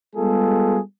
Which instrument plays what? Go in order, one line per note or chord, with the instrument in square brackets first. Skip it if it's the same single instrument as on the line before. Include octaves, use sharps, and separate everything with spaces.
[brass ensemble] G3 G#3 B3 F4 G#4 A4